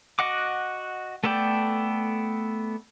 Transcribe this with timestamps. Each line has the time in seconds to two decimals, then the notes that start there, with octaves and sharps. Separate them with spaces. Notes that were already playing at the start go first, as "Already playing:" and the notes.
0.19 F#4 D#5 F#5 D6
1.24 A3 B3 A4 D5 G5